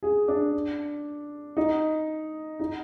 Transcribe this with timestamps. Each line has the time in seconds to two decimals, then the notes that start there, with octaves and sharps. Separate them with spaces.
0.03 G#4
0.28 D4
1.57 D#4
2.60 D#4